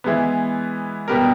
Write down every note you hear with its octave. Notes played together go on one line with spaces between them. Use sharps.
E3 G#3 B3
B2 G3 B3 G4 A#4